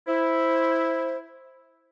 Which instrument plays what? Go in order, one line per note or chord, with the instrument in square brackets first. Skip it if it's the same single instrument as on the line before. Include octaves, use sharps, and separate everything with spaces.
[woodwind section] E4 [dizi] C5